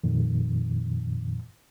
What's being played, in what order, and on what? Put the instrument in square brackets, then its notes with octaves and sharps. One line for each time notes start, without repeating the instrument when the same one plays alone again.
[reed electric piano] F2 A#2 D#3